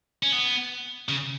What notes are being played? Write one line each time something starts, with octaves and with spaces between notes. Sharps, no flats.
C#4
B3
C#3